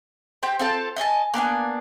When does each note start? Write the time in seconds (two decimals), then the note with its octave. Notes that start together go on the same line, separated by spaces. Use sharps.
0.43 C4 G4 G5
0.59 C4 F4 A4 A5
0.96 D#5 E5 G#5 A5
1.34 A#3 B3 D4 G#5